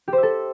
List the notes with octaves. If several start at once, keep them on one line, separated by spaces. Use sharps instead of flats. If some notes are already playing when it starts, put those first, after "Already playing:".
G4
C5
E5
A4